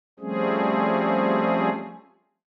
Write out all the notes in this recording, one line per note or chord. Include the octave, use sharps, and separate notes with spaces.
F3 G3 A3 C4 C#4 G#4